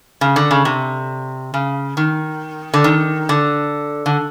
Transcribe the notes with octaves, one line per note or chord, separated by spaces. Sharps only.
C#3
D3
C#3
C3
C#3
D#3
D3
D#3
D3
D3